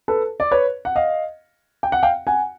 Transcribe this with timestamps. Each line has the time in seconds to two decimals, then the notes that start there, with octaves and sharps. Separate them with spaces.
0.08 A4 B4
0.40 D5
0.51 B4 C#5
0.85 F#5
0.96 D#5 F5
1.83 G5
1.92 F#5
2.03 F5 G5
2.27 F#5 G#5